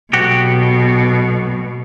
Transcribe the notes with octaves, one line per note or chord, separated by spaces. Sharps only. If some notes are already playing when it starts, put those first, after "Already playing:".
B1 B2 F#4 G4